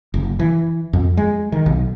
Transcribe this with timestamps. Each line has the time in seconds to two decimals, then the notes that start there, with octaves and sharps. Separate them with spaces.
0.14 F#1
0.39 E3
0.93 F2
1.17 G#3
1.52 D#3
1.66 B1